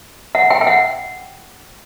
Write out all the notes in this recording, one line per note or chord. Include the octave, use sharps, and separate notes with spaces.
F#5
G5
G5
F#5